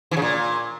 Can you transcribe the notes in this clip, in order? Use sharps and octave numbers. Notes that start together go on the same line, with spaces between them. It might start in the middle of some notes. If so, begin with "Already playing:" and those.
E3
C#3
A#2